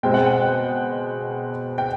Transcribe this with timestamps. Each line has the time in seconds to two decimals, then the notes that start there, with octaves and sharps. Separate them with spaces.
0.03 B2 G#3 C4 G5
0.14 F#5
0.27 G5
1.78 G5